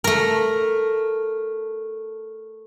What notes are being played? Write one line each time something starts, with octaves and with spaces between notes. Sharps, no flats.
A3 A#4